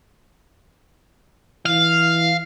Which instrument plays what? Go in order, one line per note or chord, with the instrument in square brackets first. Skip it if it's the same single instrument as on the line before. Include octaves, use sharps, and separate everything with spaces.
[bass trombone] E3 [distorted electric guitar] F5